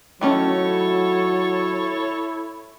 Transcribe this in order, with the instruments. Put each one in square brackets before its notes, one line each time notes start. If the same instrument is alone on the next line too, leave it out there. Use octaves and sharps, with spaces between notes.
[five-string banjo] D#3 A3 C#4 [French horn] F#3 [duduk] E4 [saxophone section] A4 C#5